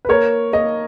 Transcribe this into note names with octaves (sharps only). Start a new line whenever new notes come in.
B4
A#3 A#4 C#5
A#3 D#5